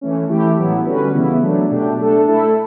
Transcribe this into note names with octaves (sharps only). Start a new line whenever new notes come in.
E3 A3 C#4
E3 A3 E4 G4
A2 F#3 B3 E4
D3 G3 C#4 F#4 B4
C#3 E3 B3 E4
F#3 A3 D4
B2 A3 D4 G4
A3 D4 A4
A3 E4 A4